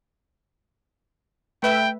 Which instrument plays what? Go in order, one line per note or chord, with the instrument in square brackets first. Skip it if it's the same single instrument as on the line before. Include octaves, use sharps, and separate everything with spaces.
[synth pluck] A3 B4 E5 [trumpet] G5